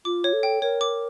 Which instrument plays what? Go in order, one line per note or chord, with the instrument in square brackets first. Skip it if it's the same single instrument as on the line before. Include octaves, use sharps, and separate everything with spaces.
[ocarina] F4 [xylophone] D6
[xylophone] C#5
[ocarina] A4
[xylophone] G5
[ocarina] A#4 [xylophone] C#5
[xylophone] D6